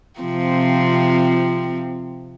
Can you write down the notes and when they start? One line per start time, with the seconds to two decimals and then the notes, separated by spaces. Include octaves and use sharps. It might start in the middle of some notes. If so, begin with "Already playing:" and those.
0.20 C3 F3 C4